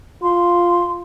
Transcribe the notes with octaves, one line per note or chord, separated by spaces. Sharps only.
F4 C6